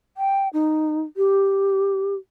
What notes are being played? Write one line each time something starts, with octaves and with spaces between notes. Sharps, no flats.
G5
D#4
G4